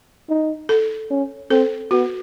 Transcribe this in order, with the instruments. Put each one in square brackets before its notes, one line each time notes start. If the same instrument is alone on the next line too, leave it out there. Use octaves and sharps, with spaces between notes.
[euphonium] D#4
[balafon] A4
[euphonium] C#4
[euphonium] C4 [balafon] A4
[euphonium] B3 [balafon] F#4